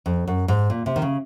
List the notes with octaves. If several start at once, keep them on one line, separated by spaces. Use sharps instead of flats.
F2
F#2
G#2
A#2
C3
D#3
C#3